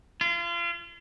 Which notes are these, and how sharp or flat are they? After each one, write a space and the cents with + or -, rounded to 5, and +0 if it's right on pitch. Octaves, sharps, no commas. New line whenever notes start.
F4 -35